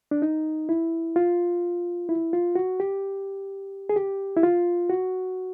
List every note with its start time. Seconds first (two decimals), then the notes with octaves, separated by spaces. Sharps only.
0.11 D4
0.22 D#4
0.69 E4
1.16 F4
2.09 E4
2.33 F4
2.55 F#4
2.80 G4
3.89 G#4
3.96 G4
4.36 E4
4.43 F4
4.89 F#4